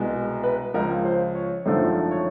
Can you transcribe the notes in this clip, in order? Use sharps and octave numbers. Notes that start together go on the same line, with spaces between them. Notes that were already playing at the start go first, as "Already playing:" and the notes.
Already playing: C2 B2 G#3
B4
C#2 C#3 F3 A#4
C5
C#5
G#1 F#2 D3 F3 A3 C5
C#5